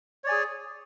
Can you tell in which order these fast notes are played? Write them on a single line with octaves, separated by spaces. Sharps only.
C#5 D5 G#5 G#4